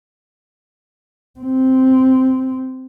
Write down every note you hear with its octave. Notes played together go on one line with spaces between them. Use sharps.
C4